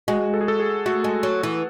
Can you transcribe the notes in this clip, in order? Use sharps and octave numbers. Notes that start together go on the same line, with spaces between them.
G#3 F#4
A4
G#4
A4
G#4
A3 F#4
G#3
F#3
E3